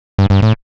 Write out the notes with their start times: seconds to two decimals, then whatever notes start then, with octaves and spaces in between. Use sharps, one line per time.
0.18 G2
0.30 G2
0.42 A2